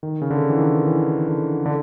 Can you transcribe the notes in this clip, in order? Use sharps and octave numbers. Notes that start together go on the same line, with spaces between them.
D#3
C#3
D3
E3
D#3
E3
D3
D3